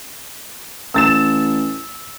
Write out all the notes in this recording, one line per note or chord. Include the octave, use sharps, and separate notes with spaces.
A1 E6 A6 E7